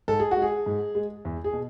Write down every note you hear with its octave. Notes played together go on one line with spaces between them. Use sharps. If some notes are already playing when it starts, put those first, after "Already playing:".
G#2 A4
G#4
F#4
G#3
G#4
G#2
G#3
E2
G#4
B2